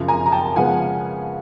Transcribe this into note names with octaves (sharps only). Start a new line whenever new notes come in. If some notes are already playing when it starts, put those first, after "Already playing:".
Already playing: F#2 C#3 F3
G#5 A#5
A#5
G5 A5
C#3 F3 G#3 B3 F#5 G#5